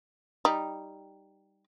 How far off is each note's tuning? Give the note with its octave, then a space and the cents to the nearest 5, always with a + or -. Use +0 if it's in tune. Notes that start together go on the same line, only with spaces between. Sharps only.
G3 +0 D#4 +0